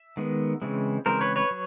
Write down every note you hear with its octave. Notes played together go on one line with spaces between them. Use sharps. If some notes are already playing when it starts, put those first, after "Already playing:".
Already playing: E5
D#3 G#3 B3
C#3 E3 G#3 C4
C#3 E3 G#3 C4 A#4 C5
B4 C#5
B4 C#5
F#3